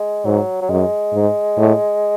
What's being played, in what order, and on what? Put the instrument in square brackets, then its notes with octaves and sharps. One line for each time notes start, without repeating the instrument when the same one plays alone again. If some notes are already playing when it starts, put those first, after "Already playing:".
Already playing: [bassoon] G#3
[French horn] G#2 [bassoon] F#3
[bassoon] F#3
[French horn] F#2 [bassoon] G#3
[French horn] G#2
A2